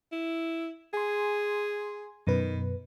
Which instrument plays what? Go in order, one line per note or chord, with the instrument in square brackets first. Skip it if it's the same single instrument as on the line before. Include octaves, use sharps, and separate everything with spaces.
[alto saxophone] E4
[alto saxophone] G#4 [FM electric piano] G#5 C6
[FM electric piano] F#2 B2 B4 [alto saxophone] D#3